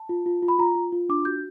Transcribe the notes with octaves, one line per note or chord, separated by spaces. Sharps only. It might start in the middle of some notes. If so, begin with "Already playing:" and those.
Already playing: A5
F4
F4
F4
B5
F4 A#5
F4
F4
D4 D6
F#4 G6